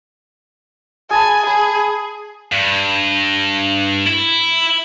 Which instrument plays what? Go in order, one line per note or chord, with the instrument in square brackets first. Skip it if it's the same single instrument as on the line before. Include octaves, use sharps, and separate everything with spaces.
[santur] G#4 A5 B5 [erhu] G#5
[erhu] G#4 [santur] B5
[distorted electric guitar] G2
E4